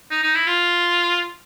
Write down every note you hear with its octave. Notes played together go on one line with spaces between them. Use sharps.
D#4
D#4
E4
F4